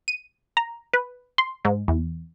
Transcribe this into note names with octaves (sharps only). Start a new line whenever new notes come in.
D#7
A#5
B4
C6
G#2
E2